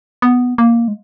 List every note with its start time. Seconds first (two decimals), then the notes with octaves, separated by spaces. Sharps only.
0.22 B3
0.58 A#3
0.88 G#3